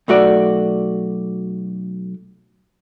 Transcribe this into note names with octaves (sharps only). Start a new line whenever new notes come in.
B1 A3 F#4 D5